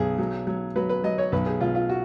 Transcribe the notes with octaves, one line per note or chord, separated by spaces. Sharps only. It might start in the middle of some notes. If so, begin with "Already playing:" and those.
Already playing: B1 G#4
F#3
F#3
F#3 B4
B4
F#3 D#5
C#5
B1 B4
G#4
B2 F4
F4
F#4